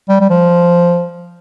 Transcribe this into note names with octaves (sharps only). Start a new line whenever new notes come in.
G3
G3
F3